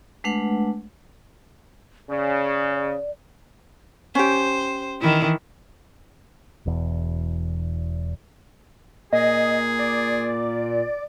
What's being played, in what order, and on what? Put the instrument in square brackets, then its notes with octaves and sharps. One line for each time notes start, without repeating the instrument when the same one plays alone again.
[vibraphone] G#3 A3 D4 B4 F#5
[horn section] C#3 [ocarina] D5
[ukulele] C#4 G4 [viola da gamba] C5
[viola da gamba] D#3 E3 E4
[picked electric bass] E1 E2
[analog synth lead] A#2 [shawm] G#4 [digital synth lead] D#5
[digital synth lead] D5